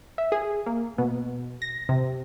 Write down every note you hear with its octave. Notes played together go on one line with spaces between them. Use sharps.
E5
G#4
A#3
B2
A#6
C3